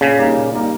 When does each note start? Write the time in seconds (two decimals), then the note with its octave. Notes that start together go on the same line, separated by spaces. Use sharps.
0.01 A#2 C#3
0.18 G3 A#3 D#4
0.36 A#2
0.53 G3 A#3 D#4